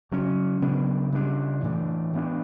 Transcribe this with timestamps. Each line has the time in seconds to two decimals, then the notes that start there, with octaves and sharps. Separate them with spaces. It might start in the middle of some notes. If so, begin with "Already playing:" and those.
0.11 C#3 F#3 C#4
0.62 C#3 F#3 B3 D4
1.12 C#3 G3 D4
1.63 A2 E3 A3 D4
2.13 E3 B3 D4